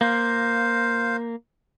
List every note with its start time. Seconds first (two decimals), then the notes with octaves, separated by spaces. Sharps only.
0.01 A#3 C5 F5